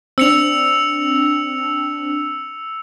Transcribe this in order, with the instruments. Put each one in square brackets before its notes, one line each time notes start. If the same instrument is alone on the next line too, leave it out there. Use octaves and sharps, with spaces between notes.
[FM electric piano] C4 D4 [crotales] E6 C#7 F7